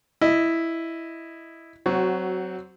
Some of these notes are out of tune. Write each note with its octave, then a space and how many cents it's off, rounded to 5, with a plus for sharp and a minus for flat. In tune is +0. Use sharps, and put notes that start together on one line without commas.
E4 +0 D#5 +0
F#3 +15 C4 -5 F#4 +0